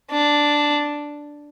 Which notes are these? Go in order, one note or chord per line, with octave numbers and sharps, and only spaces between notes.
D4